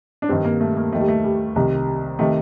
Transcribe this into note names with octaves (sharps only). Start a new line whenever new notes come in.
D4
G2 D#3 C4
A#3
A3
A#3
D#2 D#3 A3
G3
A3
G3
C2 C3 D#3
C3 D#3 A3